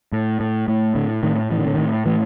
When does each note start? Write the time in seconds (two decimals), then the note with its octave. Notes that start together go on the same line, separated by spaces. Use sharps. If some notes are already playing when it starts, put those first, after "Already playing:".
0.12 A2
0.40 A2
0.68 A2
0.95 A2 D3
1.23 A2 D#3
1.51 A2 E3
1.59 D#3
1.67 D3
1.74 A2 D#3
2.06 A2 E3